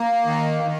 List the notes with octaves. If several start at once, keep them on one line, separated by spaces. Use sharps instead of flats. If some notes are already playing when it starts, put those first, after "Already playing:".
Already playing: A#3
D#3
D#3